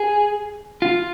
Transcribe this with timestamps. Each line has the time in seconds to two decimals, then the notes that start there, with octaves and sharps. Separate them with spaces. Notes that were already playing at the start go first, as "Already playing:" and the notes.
Already playing: G#4
0.82 F4